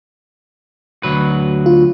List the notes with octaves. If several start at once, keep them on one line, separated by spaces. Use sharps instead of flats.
D2 F#3 B4
F4